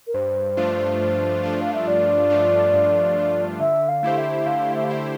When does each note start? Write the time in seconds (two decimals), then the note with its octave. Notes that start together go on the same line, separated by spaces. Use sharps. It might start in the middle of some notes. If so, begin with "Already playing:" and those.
0.07 A#4
0.14 G2 C5
0.57 F3 A3 D4 F4
1.00 G2
1.43 F3 A3 D4 F4
1.61 F5
1.73 E5
1.87 G2 D5
2.30 F3 A3 D4 F4
2.74 G2
3.16 F3 A3 D4 F4
3.59 D3 E5
3.88 F5
4.03 A3 E4 G4 C5
4.17 E5
4.46 D3 F5
4.75 E5
4.83 F5
4.89 A3 E4 G4 C5 E5